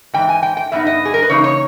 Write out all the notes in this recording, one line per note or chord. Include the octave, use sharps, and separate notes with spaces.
G#2 E3 G5
G#5
G5
G5
G2 G3 B3 D#4 E5
D#5
G#4
A#4
B4
C#3 E3 A#3 D#4 C#5
C#5